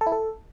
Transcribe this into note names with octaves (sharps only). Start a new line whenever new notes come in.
A4
E4
A4